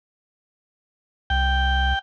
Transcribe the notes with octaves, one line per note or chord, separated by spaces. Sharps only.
C2 G5